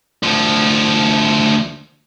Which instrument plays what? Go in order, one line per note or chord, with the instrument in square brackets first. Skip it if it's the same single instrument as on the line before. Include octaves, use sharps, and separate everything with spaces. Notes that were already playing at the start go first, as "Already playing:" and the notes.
[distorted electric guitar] D2 F3